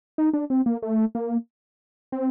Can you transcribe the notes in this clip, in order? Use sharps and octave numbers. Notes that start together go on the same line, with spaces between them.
D#4
D4
C4
A#3
A3
A#3
C4